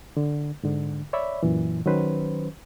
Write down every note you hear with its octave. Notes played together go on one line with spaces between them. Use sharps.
D3
G#2 D3
C#5 D5 E5 B5
F#2 A#2 E3
D#3 F#3 C#4 B4 C5